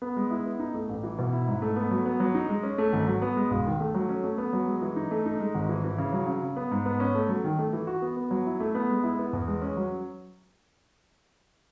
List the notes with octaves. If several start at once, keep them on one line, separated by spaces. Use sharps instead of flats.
B3
G#3
E4
B3
D#4
A3
A1
E3
B2
E4
G#2
A3
B3
F#3
B3
F#3
D#4
G#3
C#4
A3
G#1
F#3
B3
G#3
E1
D#3
A3
F#3
C#4
A3
B3
F#3
G#3
E3
D#4
A3
D#4
G#3
G#1
E3
E3
C#3
F#3
C#3
C#3
B3
G#2
B3
C#4
A3
F#3
D#3
A3
E3
F#4
B3
B3
F#3
E4
A3
B3
G#3
E4
B3
E2
G#3
C#4
F#3